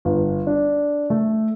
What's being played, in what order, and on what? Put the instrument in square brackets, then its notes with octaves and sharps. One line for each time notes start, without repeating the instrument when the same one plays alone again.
[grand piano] G1
D4
A3